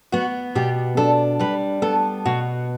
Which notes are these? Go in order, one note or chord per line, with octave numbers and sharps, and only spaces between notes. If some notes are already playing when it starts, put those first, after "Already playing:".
B3 F#4
B2 G4
D4 A4
G3 B4
B3 A4
B2 F#4